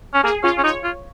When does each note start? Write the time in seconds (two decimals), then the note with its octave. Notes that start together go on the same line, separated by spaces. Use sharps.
0.14 C#4
0.24 A#3 G#4
0.44 C#4 F4
0.58 C#4
0.63 D#4 C#5
0.84 F4